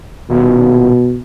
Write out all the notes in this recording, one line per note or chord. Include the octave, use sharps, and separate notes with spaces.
D#1 B2